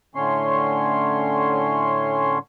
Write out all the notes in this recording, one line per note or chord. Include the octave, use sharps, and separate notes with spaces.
A2 D3 C#4 C#5 C6